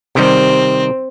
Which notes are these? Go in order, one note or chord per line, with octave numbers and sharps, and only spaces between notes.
C3 D#3 G3 C4